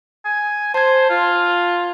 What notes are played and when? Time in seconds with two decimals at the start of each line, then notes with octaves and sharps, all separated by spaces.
0.25 G#5
0.74 C5 A5 G#6
1.10 F4